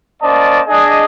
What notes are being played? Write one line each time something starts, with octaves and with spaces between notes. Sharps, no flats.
A#3 C#4 C5 D5 D#5 A5
D4 G#4 D#5